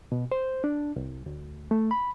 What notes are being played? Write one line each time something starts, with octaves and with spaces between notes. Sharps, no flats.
B2
C5
D4
C2
D2
A3
B5